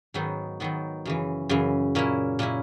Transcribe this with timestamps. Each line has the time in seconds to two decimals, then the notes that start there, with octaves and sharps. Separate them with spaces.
0.14 G#2 D#3 F#3 B3 D#4
0.60 G#2 D#3 F#3 B3 D#4
1.05 F#2 C#3 E3
1.49 F#2 C#3 E3
1.95 A#2 A#3 C#4 E4
2.39 A#2 A#3 C#4 E4